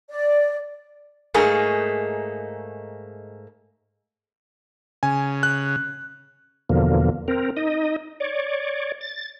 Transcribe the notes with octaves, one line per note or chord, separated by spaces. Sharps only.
D5
G#2 A3 A#3 D#4 G#4
C#3 G#5
F#6
E2 B2 D3 F3 A#3
C4 A#4
D#4 D#5
C#5 D5
A6